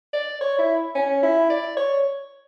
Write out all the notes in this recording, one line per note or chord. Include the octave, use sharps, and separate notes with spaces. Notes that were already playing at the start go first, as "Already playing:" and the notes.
D5
C#5
E4
C#4
E4
D5
C#5